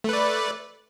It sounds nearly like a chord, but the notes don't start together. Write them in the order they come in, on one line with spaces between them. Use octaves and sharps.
A3 B4 D5